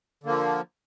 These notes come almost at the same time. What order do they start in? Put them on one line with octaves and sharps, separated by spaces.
D3 A#3 F3